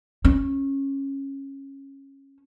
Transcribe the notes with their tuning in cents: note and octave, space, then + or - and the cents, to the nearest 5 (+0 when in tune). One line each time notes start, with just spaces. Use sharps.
C#4 -15